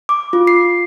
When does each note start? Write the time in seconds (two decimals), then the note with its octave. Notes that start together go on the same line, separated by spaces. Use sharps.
0.09 D6
0.33 F4
0.47 C7